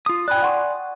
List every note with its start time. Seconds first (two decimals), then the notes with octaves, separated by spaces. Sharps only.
0.06 F4 D#6
0.28 D5 G5 G#5 B5 F#6
0.42 F#5 C6 C#6